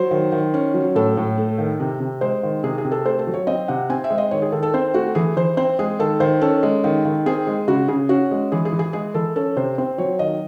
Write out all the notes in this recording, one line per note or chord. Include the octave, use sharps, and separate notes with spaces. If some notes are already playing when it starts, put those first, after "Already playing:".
Already playing: F#3 C5
D#3
D#3
C#4
F#3
A2 A4
A2
A3
D#3
C3
C3
G#3 C5
D#3
C3 G#4
G#4
C3
A4
A3 C5
A4
F#3
C#5
C4 D#5
C3 F#5
C4 G#5
E5
G#3
D#5
D#3 C#5
G#4
D#3 A4
A4
C4 C5
A3 F#4
E3 G#4
E3 C5
C4 C5
G#3 G#4
D#3 A4
D#3 C5
C#4 A4
G#3
D#3
D#3
C4 G#4
G#3
C#3 F#4
C#3 G#4
C#4 F#4
G#3
E3 G#4
G#4
E3
G#4
G#3 G#4
E3 A4
C#4 A4
C3 C5
C4 C5
F#3 C#5
D#3 D#5